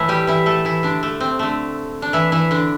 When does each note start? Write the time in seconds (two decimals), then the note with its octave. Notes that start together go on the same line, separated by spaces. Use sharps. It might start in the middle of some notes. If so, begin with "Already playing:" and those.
Already playing: A2 E3 A3 E4
0.08 G3 G4
0.27 E3 E4
0.46 A3 A4
0.65 E3 E4
0.83 D3 D4
1.03 A3
1.20 C4
1.39 D3 A3
2.02 D4
2.13 E3 E4
2.32 E3 E4
2.51 D3 D4